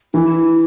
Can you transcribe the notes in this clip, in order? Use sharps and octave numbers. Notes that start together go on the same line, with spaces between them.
E3 E4